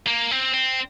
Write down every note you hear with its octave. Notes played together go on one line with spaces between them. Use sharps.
A#3
C4
C4